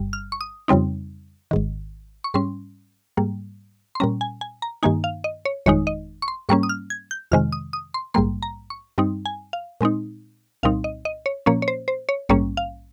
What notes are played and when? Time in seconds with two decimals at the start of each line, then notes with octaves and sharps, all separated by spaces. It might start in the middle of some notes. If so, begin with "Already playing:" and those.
Already playing: G1 G2 G3
0.13 F6
0.32 C#6
0.41 D#6
0.68 F2 C#3 G3 C4 D#4
1.51 G#1 G#2 D#3
2.24 C#6
2.34 G#2 G3 C#4 C6
3.17 G#2 G3 A#3
3.95 C6
4.00 A#2 G3 C#4 A#5
4.21 G#5
4.41 G#5
4.62 A#5
4.83 G2 D#3 A#3 D#4 G#5
5.04 F5
5.24 D#5
5.45 C#5
5.66 G1 F2 D#3 G#3 D#4 C#5
5.87 D#5
6.22 C#6
6.28 C6
6.49 G#2 G3 A#3 C#4 C#6
6.63 D#6
6.69 F6
6.90 G#6
7.11 G6
7.32 F2 C3 D#3 G#3 F6
7.52 D#6
7.73 D#6
7.94 C6
8.14 A#1 G#2 G3 A#3 C6
8.42 A#5
8.70 C#6
8.98 G2 G3 C4 D#4
9.26 G#5
9.53 F5
9.81 A#2 G#3 C4 D#4
10.63 C2 A#2 G3 C4 D#4 F5
10.84 D#5
11.05 D#5
11.26 C#5
11.46 A#2 F3 A#3 C#4 C#5
11.62 C#5
11.68 C5
11.88 C5
12.09 C#5
12.29 A#1 G#2 G3 A#3 C#4 C#5
12.57 F5